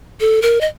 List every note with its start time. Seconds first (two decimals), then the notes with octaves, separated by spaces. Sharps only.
0.20 A4
0.42 A#4
0.61 D#5